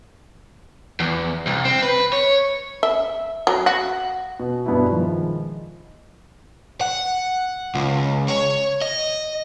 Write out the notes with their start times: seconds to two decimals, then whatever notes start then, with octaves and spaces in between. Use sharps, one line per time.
1.00 E2
1.47 C2
1.65 C4
1.83 B4
2.13 C#5
2.83 E5
3.47 F#3
3.66 F#4
4.40 B2
4.66 G2 B2 B3 D4 E4
4.92 D#3 F3 G#3
6.81 F#5
7.75 C#2
8.28 C#5
8.82 D#5